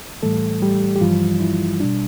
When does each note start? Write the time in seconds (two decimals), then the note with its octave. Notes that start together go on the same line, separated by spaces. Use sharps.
0.23 A2 E3 G3 A3 A4
0.62 G3 G4
0.96 G4
1.01 G2 E3 F3 G3 F4
1.40 E4
1.79 B2 G3 D4